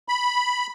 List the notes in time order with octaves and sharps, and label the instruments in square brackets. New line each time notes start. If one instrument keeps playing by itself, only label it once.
[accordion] B5